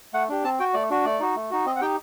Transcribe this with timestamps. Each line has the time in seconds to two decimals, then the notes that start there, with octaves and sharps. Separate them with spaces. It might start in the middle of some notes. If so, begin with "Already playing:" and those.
0.13 A3 F#5
0.29 D4 G4
0.44 C4 A5
0.59 F#4 G5
0.74 A3 D5
0.90 D4 F#4
1.05 A3 D5
1.20 D#4 F#4
1.35 A3
1.51 D#4 F#4
1.65 C4 D#5
1.76 F#5
1.81 D#4 G4 G5